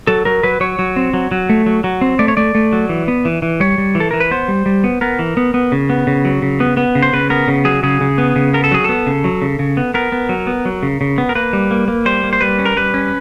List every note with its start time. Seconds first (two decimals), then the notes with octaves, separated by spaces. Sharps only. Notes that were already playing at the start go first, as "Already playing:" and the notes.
0.07 F#3 A4
0.25 F#3 A#4
0.43 F#3 B4
0.60 F#3 C#5
0.79 F#3
0.96 C4
1.14 F#3
1.31 F#3
1.49 A3
1.66 F#3
1.84 F#3
2.01 C4
2.19 A3 D5
2.28 C#5
2.37 A3 D5
2.55 A3
2.73 F#3
2.89 E3
3.08 B3
3.25 E3
3.42 E3
3.60 G3 C#5
3.78 G3
3.95 E3
4.00 A4
4.11 E3 A#4
4.20 B4
4.31 B3 C5
4.48 G3
4.66 G3
4.84 B3
5.01 B3 A#4
5.19 E3
5.37 B3
5.54 B3
5.72 C#3
5.90 B3
6.07 C#3
6.25 F#3
6.42 C#3
6.60 B3
6.77 B3
6.95 C#3
7.03 C5
7.13 C#3 B4
7.30 B3 A#4
7.48 C#3
7.65 F#3 G#4
7.83 C#3 G#4
8.01 C#3
8.18 B3
8.36 C#3
8.53 B3 A#4
8.64 A4
8.71 F#3 G#4
8.84 B3 A4
9.06 C#3
9.24 F#3
9.42 C#3
9.59 C#3
9.77 B3
9.94 B3 A#4
10.12 B3
10.29 F#3
10.47 B3
10.65 F#3
10.83 C#3
11.01 C#3
11.18 B3
11.29 A#4
11.35 A#3 B4
11.53 G3
11.71 A#3
11.88 A#3
12.06 G3 C5
12.24 A#3
12.33 C5
12.41 G3 B4
12.59 C#4
12.65 A#4
12.77 G3 B4
12.94 C#4